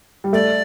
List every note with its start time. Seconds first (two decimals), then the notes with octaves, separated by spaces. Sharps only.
0.24 G3
0.33 A3 D5